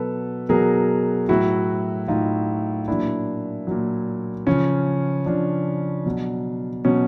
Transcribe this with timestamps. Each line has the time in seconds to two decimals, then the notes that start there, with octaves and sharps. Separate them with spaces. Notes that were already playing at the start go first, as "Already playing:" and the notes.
Already playing: B2 F#3 A4 B4
0.49 B2 F#3 G#4 A#4
1.29 A2 F#3 E4 F#4
2.08 A2 F#3 D#4 F4
2.88 A#2 F#3 D4 E4
3.67 A#2 F#3
4.47 C#3 F3 C#4
5.26 C#3 F3 D4
6.06 B2 F#3
6.85 B2 F#3 C#4